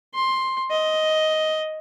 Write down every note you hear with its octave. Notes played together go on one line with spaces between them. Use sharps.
C6
D#5